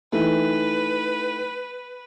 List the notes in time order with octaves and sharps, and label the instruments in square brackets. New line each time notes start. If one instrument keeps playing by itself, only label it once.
[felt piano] D#3 E3 A3 [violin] B4